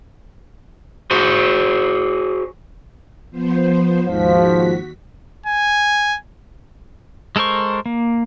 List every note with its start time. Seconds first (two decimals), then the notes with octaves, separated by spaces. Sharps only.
1.11 F#4 G#4 C5
3.31 F3 B3 C5
4.07 D#2 G#2 F3 F#4 B6
5.46 G#5
7.36 G#3 A4 A#4 C5 C#6
7.86 A#3